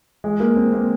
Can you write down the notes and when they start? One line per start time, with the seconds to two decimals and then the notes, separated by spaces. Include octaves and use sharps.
0.24 G#3
0.40 A#3
0.56 C4
0.73 A#3